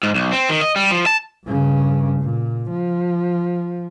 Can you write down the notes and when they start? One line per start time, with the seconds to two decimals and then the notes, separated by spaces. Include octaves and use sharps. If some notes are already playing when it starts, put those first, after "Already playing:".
0.03 G#2
0.15 B1
0.33 C4
0.50 D#3
0.62 D#5
0.76 G3
0.91 F3
1.06 A5
1.47 G2 C#3
2.20 A#2
2.70 F3